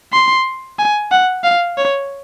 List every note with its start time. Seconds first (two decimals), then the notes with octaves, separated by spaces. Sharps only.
0.13 C6
0.79 G#5
1.11 F#5
1.44 F5
1.78 C#5